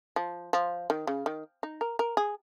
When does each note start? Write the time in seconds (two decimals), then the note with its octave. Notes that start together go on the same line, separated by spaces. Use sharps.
0.16 F3
0.53 F3
0.90 D#3
1.07 C#3
1.26 D#3
1.63 D#4
1.81 A#4
1.99 A#4
2.17 G#4